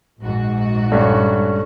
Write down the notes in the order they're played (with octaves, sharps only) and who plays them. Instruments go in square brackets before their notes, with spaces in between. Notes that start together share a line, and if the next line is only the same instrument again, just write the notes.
[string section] A#1 G#2 F#4
[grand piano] G2 A3 C#4